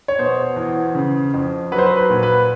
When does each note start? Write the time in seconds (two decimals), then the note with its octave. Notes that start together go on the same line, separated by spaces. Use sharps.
0.08 C#5
0.19 B2 C5
0.56 E2
0.95 C#3
1.34 F2
1.72 F#3 B4
1.78 C5
1.86 B4
1.97 B4
2.10 A#2
2.23 B4